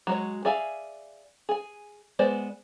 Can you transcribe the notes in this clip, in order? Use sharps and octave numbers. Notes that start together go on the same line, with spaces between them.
F#3 G#3 C#5
G#4 D5 E5 F5 G#5
G#4 G#5
G#3 B3 C5 D5